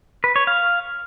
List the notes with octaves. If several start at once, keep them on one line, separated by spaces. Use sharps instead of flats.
B4
C#5
F5